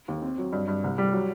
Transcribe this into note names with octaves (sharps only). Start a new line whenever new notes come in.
D#2
C4
F#3
G2
G2
C2
G3
F#3